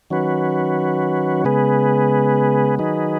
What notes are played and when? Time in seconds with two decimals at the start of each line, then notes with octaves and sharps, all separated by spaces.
0.10 D#3 F#3 C#4 F#4 B4
1.44 C#3 G#3 B3 G#4 B4
2.79 D#3 F#3 D#4 G#4 B4